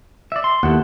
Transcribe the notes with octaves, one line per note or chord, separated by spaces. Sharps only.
D5 E5
C6
D#2 B3 E4 A4 F#5